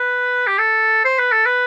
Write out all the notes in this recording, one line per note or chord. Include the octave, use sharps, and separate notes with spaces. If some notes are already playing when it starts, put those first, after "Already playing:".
Already playing: B4
G4
A4
C5
B4
A4
B4